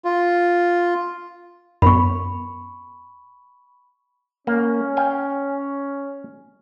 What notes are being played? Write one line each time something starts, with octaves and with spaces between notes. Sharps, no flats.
F4
F#2 B3 B5 C#6
A#3 C#4
F5 G5 G#5